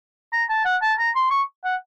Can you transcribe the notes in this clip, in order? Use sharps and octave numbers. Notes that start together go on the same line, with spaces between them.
A#5
A5
F#5
A5
A#5
C6
C#6
F#5